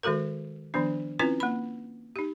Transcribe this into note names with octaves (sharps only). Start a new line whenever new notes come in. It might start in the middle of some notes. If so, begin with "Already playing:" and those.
D#3 G#3 F#4 A4 A#4
D#3 F3 B3 D4
C4 C#4 E4 F4 B4
A#3 B5
D#4 G4